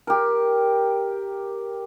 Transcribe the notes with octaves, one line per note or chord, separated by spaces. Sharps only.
G4 A#4